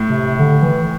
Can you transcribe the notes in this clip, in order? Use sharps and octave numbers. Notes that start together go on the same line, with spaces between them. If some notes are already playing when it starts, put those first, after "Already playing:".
Already playing: A2
C3
D3
E3